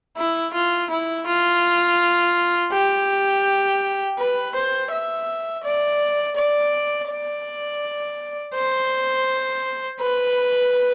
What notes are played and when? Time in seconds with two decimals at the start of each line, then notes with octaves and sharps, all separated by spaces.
0.17 E4
0.54 F4
0.91 E4
1.27 F4
2.72 G4
4.18 B4
4.55 C5
4.91 E5
5.64 D5
6.36 D5
7.09 D5
8.55 C5
10.01 B4